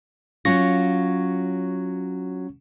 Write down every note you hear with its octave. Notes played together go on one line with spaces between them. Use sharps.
F#3 C#4 F4 C#6 A#6